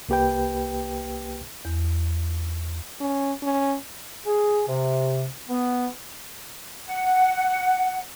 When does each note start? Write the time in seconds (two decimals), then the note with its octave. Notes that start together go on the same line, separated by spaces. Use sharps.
0.09 C2 A#3 G4 B4 G5
1.65 E2
3.00 C#4
3.42 C#4
4.26 G#4
4.68 C3
5.49 B3
6.86 F#5